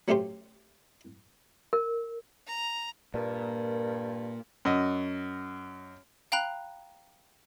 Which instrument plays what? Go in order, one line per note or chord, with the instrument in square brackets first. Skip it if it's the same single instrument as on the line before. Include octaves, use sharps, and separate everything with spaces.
[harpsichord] F#3 A3 C#4 G4 C5
[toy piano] A#4
[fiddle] A#5
[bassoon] G2 [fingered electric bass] A#2 [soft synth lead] A#4
[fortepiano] F#2 D#5
[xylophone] F5 G5 A#5 B5 F#6